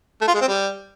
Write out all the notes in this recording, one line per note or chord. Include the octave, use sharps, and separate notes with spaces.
A3
F4
G#3
C4
G3